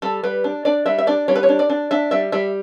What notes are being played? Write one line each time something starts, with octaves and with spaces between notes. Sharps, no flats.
G3 A4
G3 B4
D4
D4 D5
G3 E5
E5
D4 D5
G3 C#5
B4
C#5
D4
D5
D4
D4 E5
G3 E5
G3 E5